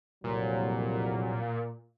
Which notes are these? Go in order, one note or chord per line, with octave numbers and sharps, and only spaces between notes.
C2 F2 A#2 F#3